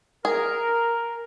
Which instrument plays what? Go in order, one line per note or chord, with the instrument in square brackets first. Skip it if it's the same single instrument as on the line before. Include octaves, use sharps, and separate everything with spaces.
[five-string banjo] G#4 [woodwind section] A#4